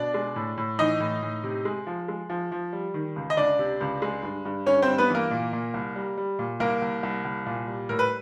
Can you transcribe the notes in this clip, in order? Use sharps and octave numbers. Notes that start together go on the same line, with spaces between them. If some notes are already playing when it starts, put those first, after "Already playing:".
Already playing: B2 D4 D5
G#3
A2
A2
E3 D#4 D#5
A2
A2
C3
G#3
F3
G#3
F3
F3
G3
D#3
C#2
D#5
C#2 D4 D5
C3
C#2
G#3
G2
G2
G2 C#4 C#5
C4 C5
G2
B3 B4
E3 A#3 A#4
A#2
A#2
C2
G3
G3
A#2
C2 A#3 A#4
C2
C2
C2
A#2
G3
A2 A#4
B4